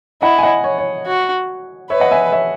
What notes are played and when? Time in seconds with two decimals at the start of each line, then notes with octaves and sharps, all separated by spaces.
0.22 E4 D#5 F#5
0.39 G#5
0.43 D#5 F#5
0.64 C#5
0.78 C#5
1.06 F#4
1.90 B4 C#5 E5
2.00 D#5 F#5
2.11 E5 G#5
2.32 C#5 E5